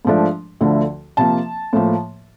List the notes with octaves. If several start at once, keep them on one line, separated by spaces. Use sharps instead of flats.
G#2 F3 A3 D4
D2 D3 F3 A3
C3 F3 A#3 A5
A2 F3 A#3